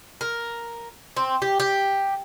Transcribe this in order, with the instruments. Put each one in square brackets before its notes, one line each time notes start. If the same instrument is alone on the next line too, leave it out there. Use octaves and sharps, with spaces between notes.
[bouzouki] A#4
C4
G4
G4